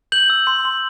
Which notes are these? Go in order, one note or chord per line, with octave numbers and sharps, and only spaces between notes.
G6 F#7
E6
C6
C6